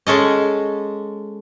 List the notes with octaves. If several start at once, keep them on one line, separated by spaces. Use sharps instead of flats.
G#3 C#4 A4 D#5